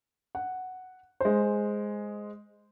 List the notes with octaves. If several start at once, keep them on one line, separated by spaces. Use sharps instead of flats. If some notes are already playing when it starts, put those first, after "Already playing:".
F#5
G#3 C5